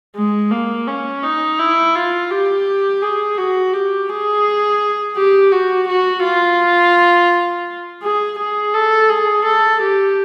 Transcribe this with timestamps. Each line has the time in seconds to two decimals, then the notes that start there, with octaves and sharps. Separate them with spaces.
0.16 G#3
0.51 A#3
0.88 C#4
1.23 D#4
1.59 E4
1.95 F4
2.30 G4
3.02 G#4
3.38 F#4
3.73 G4
4.10 G#4
5.17 G4
5.52 F#4
5.88 F#4
6.24 F4
8.02 G#4
8.39 G#4
8.74 A4
9.10 G#4
9.45 A4
9.81 G4